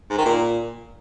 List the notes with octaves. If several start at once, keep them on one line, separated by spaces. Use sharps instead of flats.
G#2
D#3
A#2